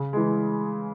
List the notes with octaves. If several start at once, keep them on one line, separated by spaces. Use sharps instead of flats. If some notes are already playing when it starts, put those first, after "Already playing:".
Already playing: C#3
E3 G#3